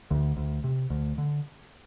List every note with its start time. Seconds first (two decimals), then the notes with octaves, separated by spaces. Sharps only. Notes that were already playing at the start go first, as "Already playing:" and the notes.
0.11 D2 D3
0.37 D2
0.64 C3
0.90 D2
1.18 D3